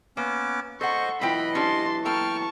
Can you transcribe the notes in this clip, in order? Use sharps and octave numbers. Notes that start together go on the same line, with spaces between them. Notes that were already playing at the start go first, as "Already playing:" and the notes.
A#3 B3 C#4 D6
A4 C5 D#5 F#5 C#6
B1 E3 E4 F4 D#5 G5 B5
C#4 D4 G4 A5 C6
A#3 A4 G5 A5 A#5 C#6 F6